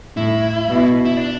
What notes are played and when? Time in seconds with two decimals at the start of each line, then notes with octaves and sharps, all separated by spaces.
0.16 A2 E4
0.67 B2
1.05 E4
1.17 D4